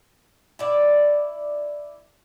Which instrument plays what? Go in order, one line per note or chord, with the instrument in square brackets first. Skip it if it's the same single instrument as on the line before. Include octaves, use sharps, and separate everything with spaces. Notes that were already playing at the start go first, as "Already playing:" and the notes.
[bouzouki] E4 D5